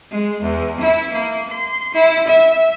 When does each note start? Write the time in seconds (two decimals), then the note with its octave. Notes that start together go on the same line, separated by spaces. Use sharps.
0.11 G#3
0.44 E2
0.81 E4
1.13 A#3
1.49 C6
1.94 E4
2.29 E5